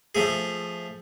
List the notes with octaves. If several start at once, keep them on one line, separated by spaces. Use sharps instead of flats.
F3 A3 G#4